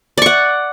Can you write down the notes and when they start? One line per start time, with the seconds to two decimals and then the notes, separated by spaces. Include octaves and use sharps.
0.18 D5
0.22 C#6
0.26 F#5